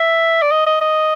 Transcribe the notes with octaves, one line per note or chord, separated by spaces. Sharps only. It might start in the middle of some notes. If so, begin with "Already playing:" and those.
Already playing: E5
D5
D#5
D#5
D#5